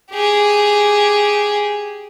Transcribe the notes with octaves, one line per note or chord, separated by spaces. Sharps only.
G4 G#4